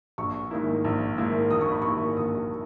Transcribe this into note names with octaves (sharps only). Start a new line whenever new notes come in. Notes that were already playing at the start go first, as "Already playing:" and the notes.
A#1 C#6
G#2 D#3 A#3 E4
A#1
G#2 D#3 A#3 E4
A#1 D#6
C#6
B5
G#2 D#3 A#3 E4 C#6
A#1 D#6